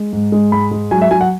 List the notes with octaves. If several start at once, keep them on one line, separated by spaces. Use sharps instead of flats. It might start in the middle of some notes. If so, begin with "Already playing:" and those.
Already playing: G#3
G#2
G#3
G#2 B5
G#3
F#3 G#5
E5
F#3 G#5
F#5